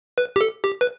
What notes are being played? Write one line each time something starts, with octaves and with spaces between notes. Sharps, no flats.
B4
G4
A4
G4
B4